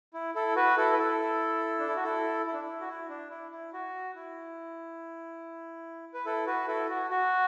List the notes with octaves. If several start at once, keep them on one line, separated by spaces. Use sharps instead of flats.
E4
E4 A4
F#4 B4
E4 A4
B4
E4 A4
D4
E4
F#4
E4 A4
E4
D4
E4
F#4
E4
D4
E4
E4
F#4
E4
B4
E4 A4
F#4 B4
E4 A4
F#4
F#4